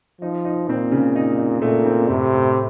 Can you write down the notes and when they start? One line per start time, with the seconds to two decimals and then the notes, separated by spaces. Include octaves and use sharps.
0.21 F3 D#4
0.45 D#4
0.68 A#2 C4
0.92 C#3
1.16 D#4
1.38 D#4
1.62 A#2 A3
1.86 C4
2.09 A2 C3
2.32 A2